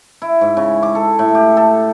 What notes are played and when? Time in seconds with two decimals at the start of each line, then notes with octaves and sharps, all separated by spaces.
0.22 E4
0.41 G#2
0.57 C#3
0.83 D6
0.95 A4
1.19 A2
1.35 G4
1.57 A4